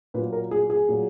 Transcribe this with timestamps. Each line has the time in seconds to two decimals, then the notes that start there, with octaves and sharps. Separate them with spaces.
0.14 A#2 B4
0.17 F#3
0.33 A#4
0.51 G#4
0.70 G#4
0.88 A#2 F#3